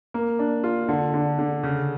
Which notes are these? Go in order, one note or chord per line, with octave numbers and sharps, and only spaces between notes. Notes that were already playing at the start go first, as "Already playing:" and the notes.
A#3
D4
F4
D3
D3
D3
C#3